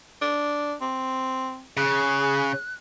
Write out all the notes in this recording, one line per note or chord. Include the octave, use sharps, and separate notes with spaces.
D4
C4
C#3 G#4 F#6